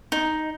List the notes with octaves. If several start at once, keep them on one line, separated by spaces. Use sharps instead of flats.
D#4